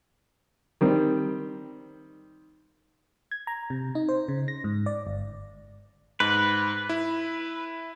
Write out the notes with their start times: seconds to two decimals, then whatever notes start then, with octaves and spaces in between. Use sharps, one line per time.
0.81 D#3 G3 C4
3.31 G#6
3.47 A#5
3.70 C3
3.95 D#4
4.09 C5
4.28 C#3
4.48 A#6
4.64 G#2
4.86 D5
5.07 G1
6.20 G#2 B4
6.89 E4